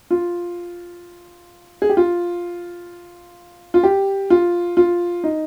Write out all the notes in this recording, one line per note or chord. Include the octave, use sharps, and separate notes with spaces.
F4
G#4
G4
F4
F4
G4
F4
F4
D#4